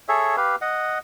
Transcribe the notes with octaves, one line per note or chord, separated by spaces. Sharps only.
G#4 A4 C#5 E5
G4 B4 F5
D#5 F#5